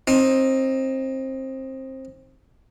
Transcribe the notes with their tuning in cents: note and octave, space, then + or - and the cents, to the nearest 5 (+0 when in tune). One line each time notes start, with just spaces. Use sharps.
C4 +20 D#4 +0